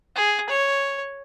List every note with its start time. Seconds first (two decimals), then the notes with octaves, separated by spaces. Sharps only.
0.15 G#4
0.50 C#5